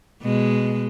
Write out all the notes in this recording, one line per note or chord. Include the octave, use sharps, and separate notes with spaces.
B2 G#3